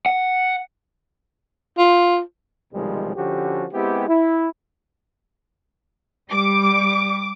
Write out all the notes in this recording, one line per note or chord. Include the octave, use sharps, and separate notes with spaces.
F#5
F4
B1 C3 D#3 F3 G3 G#3
D3 F3 C#4 F#4 G4
G#3 B3 C4 E4 G4
E4
G3 D6